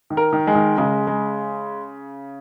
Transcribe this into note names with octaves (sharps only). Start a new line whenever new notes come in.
D#3
A#4
D#3
G#3
D#3
C#3 G#3
G#3